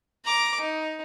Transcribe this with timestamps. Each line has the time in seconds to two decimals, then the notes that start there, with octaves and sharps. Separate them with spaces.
0.25 A#5 D6
0.61 D#4